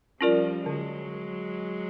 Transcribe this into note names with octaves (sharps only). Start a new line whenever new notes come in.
F3 G3 C#4 F4 A#4 D5
D3 F#3 G#3